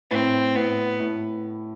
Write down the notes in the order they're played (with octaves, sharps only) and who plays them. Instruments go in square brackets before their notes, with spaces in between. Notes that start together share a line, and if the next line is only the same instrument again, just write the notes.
[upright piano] A2 [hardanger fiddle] C4
[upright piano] A2 [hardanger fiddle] B3
[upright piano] A2